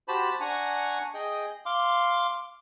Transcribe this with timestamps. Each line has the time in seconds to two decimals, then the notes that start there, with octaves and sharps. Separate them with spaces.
0.08 F#4 G4 C5 A5 B5
0.40 D4 F#5 G#5 A#5 C#6
1.14 G#4 D#5 G5
1.66 F5 C6 D6